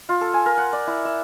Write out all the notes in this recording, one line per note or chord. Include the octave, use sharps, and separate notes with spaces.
F4
A4
G#5
A#4
F#5
D5
E4
E5